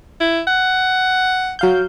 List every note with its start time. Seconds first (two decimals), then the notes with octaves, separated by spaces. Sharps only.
0.21 E4
0.47 F#5
1.59 F#3 F5 G6